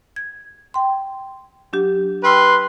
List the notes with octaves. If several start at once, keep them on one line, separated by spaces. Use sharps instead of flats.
G#6
G5 C6
F#3 D4 G4
B4 G5 C6 E6 F6